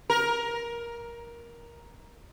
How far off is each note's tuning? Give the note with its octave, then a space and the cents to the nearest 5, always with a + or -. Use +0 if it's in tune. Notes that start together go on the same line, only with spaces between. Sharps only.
A#4 +15